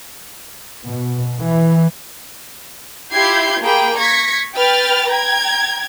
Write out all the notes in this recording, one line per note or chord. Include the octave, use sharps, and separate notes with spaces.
B2
E3
E4 F4 G4 G6 G#6 C7
A#3 G#4 G5 B5
C#6 G#6 A#6 B6 C#7
B4 G5 F6 A6
G5 A#5 G#6